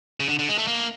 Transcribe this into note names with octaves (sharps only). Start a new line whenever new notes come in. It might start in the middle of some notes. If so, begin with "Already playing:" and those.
C#3
D3
D3
G#3
A3
A#3